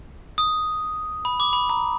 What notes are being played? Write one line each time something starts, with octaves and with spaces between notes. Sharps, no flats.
D#6
B5
D6
B5
A#5